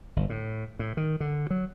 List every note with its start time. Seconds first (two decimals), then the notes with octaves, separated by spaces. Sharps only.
0.16 G1
0.30 A2
0.79 A2
0.97 D#3
1.20 D3
1.50 F#3